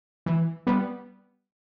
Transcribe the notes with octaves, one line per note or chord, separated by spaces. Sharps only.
E3
G3 B3